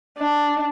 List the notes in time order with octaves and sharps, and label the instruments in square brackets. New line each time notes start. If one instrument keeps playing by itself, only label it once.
[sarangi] D4